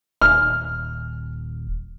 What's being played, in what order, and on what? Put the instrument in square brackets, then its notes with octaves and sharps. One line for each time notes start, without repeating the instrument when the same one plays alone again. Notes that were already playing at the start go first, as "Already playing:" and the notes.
[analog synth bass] D#1 [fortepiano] F6